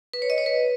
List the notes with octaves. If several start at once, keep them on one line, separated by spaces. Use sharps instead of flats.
B4
C#5
D#5
C#5
B4